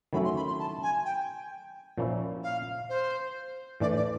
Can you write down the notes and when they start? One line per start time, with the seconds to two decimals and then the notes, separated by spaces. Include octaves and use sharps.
0.13 D#3 F#3 A3 C#4 E4 B5
0.24 C6
0.36 B5
0.48 C6
0.59 A5
0.83 G#5
1.05 G5
1.98 A#2 F3 A#3 C#4 E4
2.43 F5
2.89 C5
3.80 A2 E3 A3 D4 D5
3.96 D5